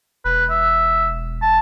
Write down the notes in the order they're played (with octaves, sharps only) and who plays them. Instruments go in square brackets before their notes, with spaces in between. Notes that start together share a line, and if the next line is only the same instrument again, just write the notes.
[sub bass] E1 [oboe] B4
[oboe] E5
A5